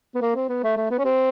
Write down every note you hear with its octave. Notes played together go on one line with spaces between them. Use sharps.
B3
A#3
C4
B3
A3
A3
B3
C#4
C4